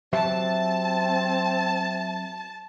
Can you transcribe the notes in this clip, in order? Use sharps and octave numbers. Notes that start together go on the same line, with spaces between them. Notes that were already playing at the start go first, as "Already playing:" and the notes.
F#3 C4 G4 C5 E5 A5